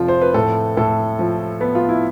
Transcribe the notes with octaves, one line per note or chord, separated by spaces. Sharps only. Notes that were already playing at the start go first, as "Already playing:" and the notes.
Already playing: F1 F3 F4
C5
B4
A2 A4
A2 A4
F3
B3
F4
E4